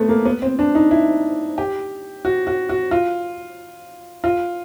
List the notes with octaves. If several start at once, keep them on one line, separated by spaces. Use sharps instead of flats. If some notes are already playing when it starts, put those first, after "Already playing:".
Already playing: A3 B3 C4
A#3
B3
C4
D4
D#4
E4
G4
F#4
F#4
F#4
F4
F4